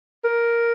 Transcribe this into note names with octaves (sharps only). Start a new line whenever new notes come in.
A#4